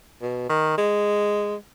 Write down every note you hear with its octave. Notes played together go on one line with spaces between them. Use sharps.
B2
D#3
G#3